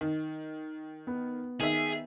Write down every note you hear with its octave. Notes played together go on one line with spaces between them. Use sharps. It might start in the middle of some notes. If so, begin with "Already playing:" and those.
D#3
B3
D#3 G#4 E5